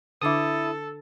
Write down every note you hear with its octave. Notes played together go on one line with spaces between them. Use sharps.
D3 D4 E4 A4 D6 D#6